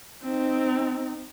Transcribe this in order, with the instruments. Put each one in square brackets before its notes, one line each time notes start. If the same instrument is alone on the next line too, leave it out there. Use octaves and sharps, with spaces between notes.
[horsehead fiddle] C4 D#4